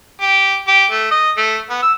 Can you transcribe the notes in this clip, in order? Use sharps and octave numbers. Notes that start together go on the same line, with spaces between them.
G4
G4
A3
D#5
A3
B3
E6